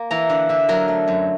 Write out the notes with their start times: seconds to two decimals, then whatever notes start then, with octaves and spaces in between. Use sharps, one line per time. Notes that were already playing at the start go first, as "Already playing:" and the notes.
Already playing: A#3
0.11 E3 A#5
0.29 D3 F#5
0.49 D3 E5
0.69 F#3 A#4
0.88 A3
1.08 F#2